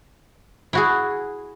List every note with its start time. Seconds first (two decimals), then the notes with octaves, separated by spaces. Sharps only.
0.73 E4 F#4 G#4